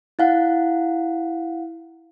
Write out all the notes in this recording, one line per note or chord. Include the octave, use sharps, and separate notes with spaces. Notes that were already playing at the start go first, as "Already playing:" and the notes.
E4 F5 F#5